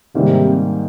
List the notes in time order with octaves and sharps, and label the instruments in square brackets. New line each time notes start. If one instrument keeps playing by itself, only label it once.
[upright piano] G#2 D#3 G3 A#3 [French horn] C3